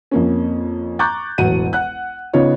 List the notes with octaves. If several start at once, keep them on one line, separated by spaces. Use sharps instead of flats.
F2 A#3 C#4
A#5 C#6 D6 F#6 G6 A6
E1 A1 F#3 F#5 D#7
F#5 F#6
C#3 B3 C#4 D#4 F4 C#5